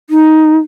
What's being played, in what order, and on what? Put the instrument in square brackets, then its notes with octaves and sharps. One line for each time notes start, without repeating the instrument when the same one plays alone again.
[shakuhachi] D#4